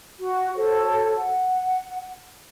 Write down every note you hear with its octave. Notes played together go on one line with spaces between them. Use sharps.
F#4
F#4 A4 C5 C#5
F#5